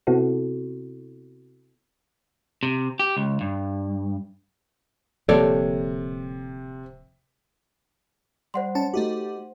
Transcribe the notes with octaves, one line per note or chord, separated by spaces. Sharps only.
C3 B3 C4 E4 F#4 A4
C3
G4
C#2
G2
D1 C3 F3 A#3 A4 C#5 D5
G3 C5 F#5 C6
C#4 A5
A3 D#4 F#4 G4